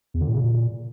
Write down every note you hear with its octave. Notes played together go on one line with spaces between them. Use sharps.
E2
D3
A2
C#3
A#2